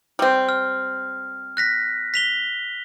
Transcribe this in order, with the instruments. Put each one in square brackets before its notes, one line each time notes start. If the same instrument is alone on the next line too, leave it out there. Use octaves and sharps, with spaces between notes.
[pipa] G3 C4
[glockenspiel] F6
F#6 A#6 B6
B6 F7 G7